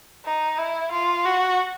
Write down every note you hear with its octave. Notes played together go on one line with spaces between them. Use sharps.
D#4
E4
F4
F#4